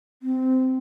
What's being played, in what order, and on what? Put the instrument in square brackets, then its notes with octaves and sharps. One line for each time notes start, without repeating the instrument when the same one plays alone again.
[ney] C4